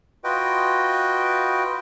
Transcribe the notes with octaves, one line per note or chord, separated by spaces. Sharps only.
F4 F#4 B4 D#5 G5